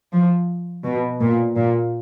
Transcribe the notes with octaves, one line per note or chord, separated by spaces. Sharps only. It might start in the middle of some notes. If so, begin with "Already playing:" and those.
F3
B2
A#2
A#2